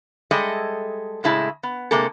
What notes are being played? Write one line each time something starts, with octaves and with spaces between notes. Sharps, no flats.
G3 G#3 A4 D#5 E5
A2 C#3 G#3 E4 A5
B3
C3 G#3 A#3 G#4 A4